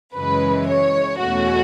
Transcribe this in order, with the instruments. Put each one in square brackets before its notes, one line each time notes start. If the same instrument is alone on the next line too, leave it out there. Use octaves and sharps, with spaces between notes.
[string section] F#2 C#3 E3 G#3 B4
C#5
E2 B2 A3 C#4 F#4